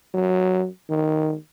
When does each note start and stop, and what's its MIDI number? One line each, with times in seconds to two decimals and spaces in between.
0.14 0.67 54
0.89 1.35 51